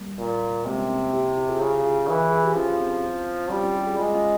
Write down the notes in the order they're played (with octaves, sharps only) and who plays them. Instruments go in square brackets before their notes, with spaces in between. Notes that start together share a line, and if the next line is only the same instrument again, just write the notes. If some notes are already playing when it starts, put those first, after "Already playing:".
Already playing: [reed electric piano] G3 A#3
[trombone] A#2
[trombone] C3 [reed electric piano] G#3 C4
[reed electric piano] A#3 C#4
C4 E4
E4 G4
E4 G4
F4 G#4
[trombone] C#3 [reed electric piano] F4 G#4
[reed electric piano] F4 G#4
[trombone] E3
[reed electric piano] G#4
G4
[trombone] F3 [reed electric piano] C#4 F4
[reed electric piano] C4 E4
[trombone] G3 [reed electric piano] C#4 F4
[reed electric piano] C#4 F4
E4 G4
F4 G#4
[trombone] G#3 [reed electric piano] F4 G#4
[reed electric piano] C#4 F4